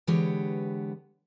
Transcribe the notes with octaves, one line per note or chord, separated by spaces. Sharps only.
D3 E3 G#3 B3 G4 C#5